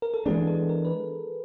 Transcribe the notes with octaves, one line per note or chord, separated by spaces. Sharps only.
A#4
A4
E3 G#3 B3 D4 G#4
A4
A#4
B4